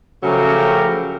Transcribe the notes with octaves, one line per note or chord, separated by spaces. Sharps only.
C#3 F3 F#3 A3 G4 A#4